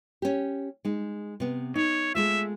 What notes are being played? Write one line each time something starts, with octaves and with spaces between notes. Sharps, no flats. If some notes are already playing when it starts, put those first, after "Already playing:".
C#4 G4
G#3 D#4
C3 B3
D#4 C#5
G#3 A3 F4 E5